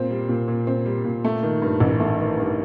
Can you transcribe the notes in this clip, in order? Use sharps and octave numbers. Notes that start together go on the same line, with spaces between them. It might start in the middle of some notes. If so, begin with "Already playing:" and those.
Already playing: A#2 C4
G3
A#2
A#2
C4
G3
A#2
A3
D#3
G2
A1
A3
D#3
G2